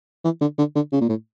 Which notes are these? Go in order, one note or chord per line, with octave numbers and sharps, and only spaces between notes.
E3
D3
D3
D3
C#3
A#2
A2